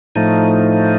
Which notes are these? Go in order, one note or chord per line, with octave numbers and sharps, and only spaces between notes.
A2 F3 A3 D#4